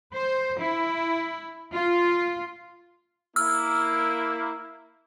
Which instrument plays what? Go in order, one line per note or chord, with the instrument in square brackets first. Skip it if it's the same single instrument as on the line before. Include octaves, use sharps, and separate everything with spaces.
[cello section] C5
E4
F4
[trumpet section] A#3 E4 [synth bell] E6 F6